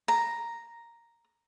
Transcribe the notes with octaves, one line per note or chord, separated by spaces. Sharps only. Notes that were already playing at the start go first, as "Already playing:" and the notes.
A#5